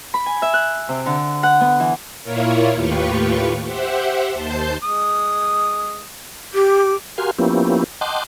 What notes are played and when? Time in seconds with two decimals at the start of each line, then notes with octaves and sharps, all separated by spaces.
0.14 B5
0.26 G#5
0.42 E5
0.54 F#6
0.89 C3
1.06 D3
1.43 F#5
1.61 B3
1.80 E3
2.23 A#2 A#3 E4 F4 A#4 C#5
2.74 D#2 A2 F4 G4 B4 C#6
3.65 G4 C5 E5 F#5
4.33 D#2 C5 A5 G6 C7
4.82 G#3 D#6
6.54 G4 D6
7.18 F#4 G4 A#4 F5 G#5 C6
7.39 F3 A#3 B3 C#4 E4 G4
8.01 D#5 F#5 G5 A5 C6 D6